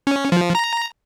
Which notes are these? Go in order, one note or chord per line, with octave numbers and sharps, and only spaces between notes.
C#4
F3
A#5